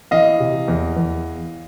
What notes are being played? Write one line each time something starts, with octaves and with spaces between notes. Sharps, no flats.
E3 D#5 F5
C3
E2
E2